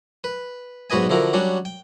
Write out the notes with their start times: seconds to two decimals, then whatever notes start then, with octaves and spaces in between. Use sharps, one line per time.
0.24 B4
0.90 B1 G#2 F#4 B4 D#5 G#5
1.09 D3 F3 E4 F#4 A#4
1.33 F#3 G3 C#4 D4 F#4
1.65 G5